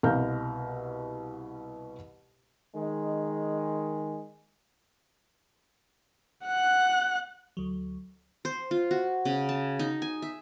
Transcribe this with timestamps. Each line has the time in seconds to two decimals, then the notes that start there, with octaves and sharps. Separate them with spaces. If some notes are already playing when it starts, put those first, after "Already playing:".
0.03 C2 B2 F5 A#5 F6 G6
2.76 D#3 G#3
6.45 F#5 F#6
7.57 D2 F#3
8.45 C5
8.71 F4
8.91 F#4
9.25 C#3
9.49 A5
9.79 D#4
10.02 G#5
10.22 E5